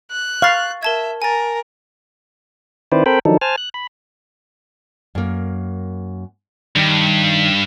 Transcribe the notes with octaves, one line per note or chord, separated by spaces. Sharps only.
F#6
F5 C#6 A6
A#4 E5 A5 G#6
A#4 G#5 A6
D#3 C4 E4 B4 C5 D5
C4 A4 A#4 C5 G5 B5
D#3 F3 F#3 D4 D#4 A4
C5 G#5 A5 F6
F#6
B5
F#2 A#3
G2 D#3